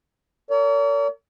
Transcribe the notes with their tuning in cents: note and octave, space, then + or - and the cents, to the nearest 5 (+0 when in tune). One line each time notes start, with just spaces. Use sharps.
A#4 -35 C#5 +45